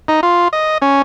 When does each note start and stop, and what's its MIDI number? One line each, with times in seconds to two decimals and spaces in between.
0.08 0.21 63
0.23 0.48 65
0.53 0.78 75
0.82 1.02 61